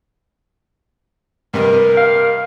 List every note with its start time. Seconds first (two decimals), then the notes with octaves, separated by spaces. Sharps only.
1.54 G2 C3 A#4 D#5
1.97 F5